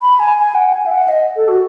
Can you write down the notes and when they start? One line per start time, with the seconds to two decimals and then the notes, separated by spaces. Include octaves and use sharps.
0.02 B5
0.19 G#5
0.38 G#5
0.55 F#5
0.72 G#5
0.86 E5
0.91 F#5
1.08 D#5
1.36 A4
1.48 F#4